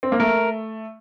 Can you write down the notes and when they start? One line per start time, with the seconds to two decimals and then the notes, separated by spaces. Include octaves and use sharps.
0.03 C4
0.12 A#3
0.20 A3 A#4